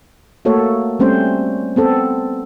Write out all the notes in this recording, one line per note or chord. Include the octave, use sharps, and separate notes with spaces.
A3 A#3 F#4 A4 C#5
G3 A3 C4 C#4 C5
B3 C4 A4